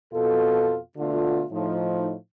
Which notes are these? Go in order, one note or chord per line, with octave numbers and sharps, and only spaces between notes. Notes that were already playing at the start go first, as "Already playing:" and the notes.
F2 B2 F4 A4
B2 D3 A3 F4
A2 F3 D#4